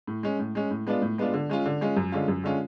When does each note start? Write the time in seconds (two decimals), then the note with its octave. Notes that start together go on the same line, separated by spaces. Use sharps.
0.07 A2
0.23 G#3 C#4
0.39 A2
0.55 G#3 C#4
0.71 A2
0.87 G#3 B3 D4 F4
1.02 A2
1.18 G#3 B3 D4 F4
1.34 D3
1.50 G#3 C#4 F4
1.66 D3
1.81 G#3 C#4 F4
1.97 F#2
2.12 D3 G#3 C#4 F4
2.28 F#2
2.44 D3 G#3 C#4 F4